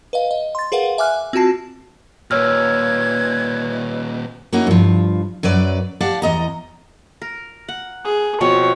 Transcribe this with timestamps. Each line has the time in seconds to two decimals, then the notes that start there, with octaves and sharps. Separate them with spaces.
0.13 B4 D#5 F5
0.31 D#5
0.55 C6 A6
0.72 G#4 A#4 B4 F5 F#5
0.98 E5 G#5 D6 F6 F#6
1.33 C4 F4 F#4 A5 C7
2.31 D#2 A#2 B4 C#5 E6 F6 G#6
4.53 A#3 C#4 D#4 E4 F#4
4.67 G2 F3
5.43 F#2 F#3 B4 D5
6.01 G4 D5 F5 F#5 A5
6.22 E2 D#5 A#5
7.22 A#4
7.68 F#5
8.05 G#4
8.41 B2 F3 C4 C#5